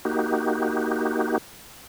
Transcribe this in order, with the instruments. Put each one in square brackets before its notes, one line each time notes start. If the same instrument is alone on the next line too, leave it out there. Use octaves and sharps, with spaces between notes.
[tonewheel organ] A#3 D#4 F#4 G4